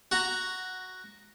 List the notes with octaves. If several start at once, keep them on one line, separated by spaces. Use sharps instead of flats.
F#4 A#5